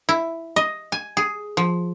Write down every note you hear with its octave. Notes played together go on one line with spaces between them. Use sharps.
E4
D#5
G#5
G#4
F3